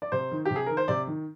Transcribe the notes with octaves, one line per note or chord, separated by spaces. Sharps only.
D5
C3 C5
D#3
G4
C3
G#4
D#3 A#4
C5
C3 D5
D#3